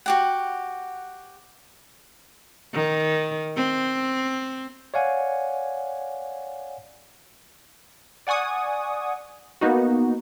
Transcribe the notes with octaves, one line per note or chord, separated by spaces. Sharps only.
F#4 G4 F#5
D#3
C4
C#5 D5 F5 F#5 G#5
D5 F#5 G#5 C#6 D#6
A#3 B3 D#4 F#4